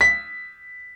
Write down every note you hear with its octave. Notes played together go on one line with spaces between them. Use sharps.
B6